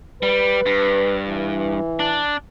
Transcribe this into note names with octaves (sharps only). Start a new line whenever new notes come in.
G3 B4
G2
E3
D4